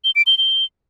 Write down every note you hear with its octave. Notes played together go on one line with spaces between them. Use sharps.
G7
D7
G7
G7